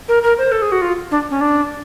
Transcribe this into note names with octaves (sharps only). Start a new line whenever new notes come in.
A#4
A#4
C5
A4
G#4
F#4
F4
D4
C#4
D4